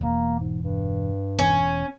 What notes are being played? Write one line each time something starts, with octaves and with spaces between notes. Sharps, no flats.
E1 E2 A#3
G#2
G2
E1 E2 C#4